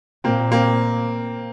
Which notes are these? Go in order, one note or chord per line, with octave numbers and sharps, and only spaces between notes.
A#2 A#3 C4
A#3 C4